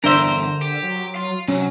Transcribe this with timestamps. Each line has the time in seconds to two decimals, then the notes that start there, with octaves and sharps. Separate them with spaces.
0.04 E2 G2 D3 D4 A#4 C5 E5
0.62 G4
0.83 F#3
1.15 F5 C6
1.48 C3 F#3 C#4